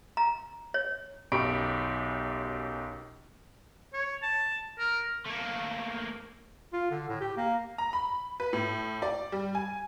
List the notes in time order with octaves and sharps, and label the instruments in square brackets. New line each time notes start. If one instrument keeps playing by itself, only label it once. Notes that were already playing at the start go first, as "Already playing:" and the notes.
[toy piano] A#5
C#5
[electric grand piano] B1 F#2 G4 B5 C#6 D7
[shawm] C#5
A5
A#4
[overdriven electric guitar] A3 A#3
[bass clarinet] F4
D3
A2
G4
A#3
[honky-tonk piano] A#5
B5
B4
A2
D5
G3
G#5